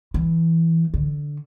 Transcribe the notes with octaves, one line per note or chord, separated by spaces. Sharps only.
E3
D3